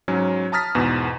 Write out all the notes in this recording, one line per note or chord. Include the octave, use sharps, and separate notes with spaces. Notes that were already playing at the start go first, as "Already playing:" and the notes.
G#2 F#3 C#4
A5 A#5 D#6 F6 A6 B6
E2 G#2 B2